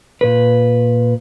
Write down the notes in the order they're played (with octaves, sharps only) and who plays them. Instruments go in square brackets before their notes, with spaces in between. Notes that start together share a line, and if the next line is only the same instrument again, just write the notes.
[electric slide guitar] A#2 B4